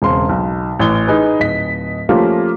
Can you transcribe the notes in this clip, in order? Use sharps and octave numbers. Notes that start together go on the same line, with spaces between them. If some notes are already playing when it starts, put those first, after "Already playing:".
E1 C#3 C4 C6
B1
A1 E3 G7
D#4 G#4 B4
D1 D#5 B6
F3 A3 A#3 C#4 F4 G4